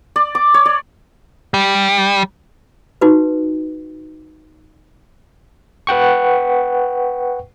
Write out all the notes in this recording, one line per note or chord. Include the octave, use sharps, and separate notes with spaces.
D5
D6
C#5
D5
G3
D#4 F#4 B4
B4 F#5 G5 C#6